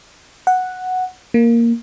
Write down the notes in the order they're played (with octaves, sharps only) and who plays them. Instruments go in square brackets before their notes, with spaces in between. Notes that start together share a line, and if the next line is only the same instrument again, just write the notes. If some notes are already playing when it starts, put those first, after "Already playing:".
[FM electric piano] F#5
A#3